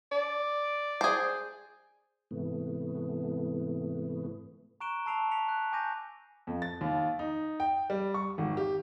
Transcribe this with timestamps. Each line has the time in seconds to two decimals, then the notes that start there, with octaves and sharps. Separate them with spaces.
0.12 D5
1.01 G#4 C5
2.31 G#2 C3 E3 A3 B3
4.81 A#5 C#6 F#6 D7 E7 G7
5.06 A5 B5 E6 C7 D7 F7
5.32 B6 C#7 F7
5.49 F#6
5.73 G#5 D6 G6 A#6 D#7
6.47 F2
6.62 A6
6.81 D#2
7.19 D#4
7.60 G5
7.90 G3
8.14 C#6
8.38 G#1
8.57 G4